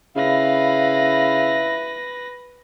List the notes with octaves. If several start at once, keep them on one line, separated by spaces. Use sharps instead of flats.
C#3 E4 B4 F5 A#6